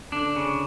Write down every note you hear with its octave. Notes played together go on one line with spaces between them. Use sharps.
D3 D4
C#3